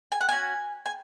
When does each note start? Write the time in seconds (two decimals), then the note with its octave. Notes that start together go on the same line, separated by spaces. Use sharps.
0.12 G#5
0.21 F#5
0.29 A3 C#4 F#4 G#5
0.86 G#5